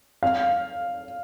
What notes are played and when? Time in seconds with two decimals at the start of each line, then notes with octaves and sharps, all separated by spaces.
0.23 F5